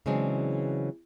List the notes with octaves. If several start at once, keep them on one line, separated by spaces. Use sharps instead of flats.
C#3 E3 F#3 G#3 C4 D4